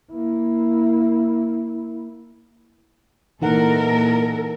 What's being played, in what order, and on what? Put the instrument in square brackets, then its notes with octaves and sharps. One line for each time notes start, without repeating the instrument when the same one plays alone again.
[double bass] A#3 E4
[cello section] A#2 A4 A#4 [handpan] E3 D#4 F#5